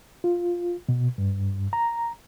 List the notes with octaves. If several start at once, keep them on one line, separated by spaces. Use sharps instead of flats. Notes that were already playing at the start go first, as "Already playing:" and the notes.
F4
B2
G2
A#5